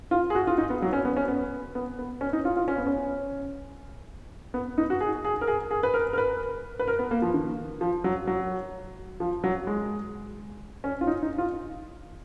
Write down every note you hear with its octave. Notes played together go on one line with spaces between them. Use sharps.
F4
G#4
F#4
F4
D#4
B3
F#3
C#4
B3
C#4
B3
B3
B3
C#4
D#4
F4
F4
C#4
B3
C#4
B3
D#4
F#4
G#4
G#4
A#4
G#4
G#4
B4
A#4
A#4
B4
B4
A#4
B3
A#3
F3
D#3
F3
F#3
F#3
F3
F#3
G#3
C#4
F4
D#4
D#4
F4